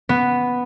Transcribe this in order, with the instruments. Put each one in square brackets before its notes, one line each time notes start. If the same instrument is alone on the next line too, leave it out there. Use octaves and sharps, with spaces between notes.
[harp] B3